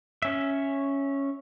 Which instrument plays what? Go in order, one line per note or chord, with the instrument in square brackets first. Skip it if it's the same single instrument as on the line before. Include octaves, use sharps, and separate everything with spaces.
[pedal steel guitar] C#4 E5